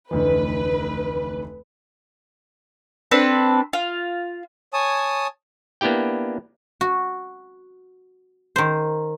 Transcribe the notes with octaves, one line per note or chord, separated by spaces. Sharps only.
F1 D2 E3 B4
C4 D4 A4 B4
F4
C#5 G#5 A5 D#6
A#3 B3 D4 E4 G4 G5
F#4
D#3 C5